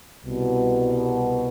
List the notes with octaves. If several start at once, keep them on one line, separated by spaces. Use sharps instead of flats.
C2 B2